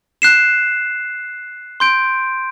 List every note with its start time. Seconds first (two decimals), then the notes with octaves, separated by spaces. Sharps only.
0.22 F#6 C7 E7
1.80 C6 G6 D7